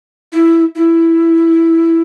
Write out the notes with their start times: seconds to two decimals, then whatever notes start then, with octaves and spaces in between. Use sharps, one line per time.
0.32 E4
0.75 E4